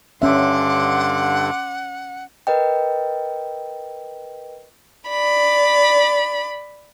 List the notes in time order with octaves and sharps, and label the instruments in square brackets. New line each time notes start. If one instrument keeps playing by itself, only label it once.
[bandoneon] G2 D3 [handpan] C#4 E5 [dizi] F#5 [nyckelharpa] C6 D6
[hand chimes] A#4 B4 D#5 G5
[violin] D5 B5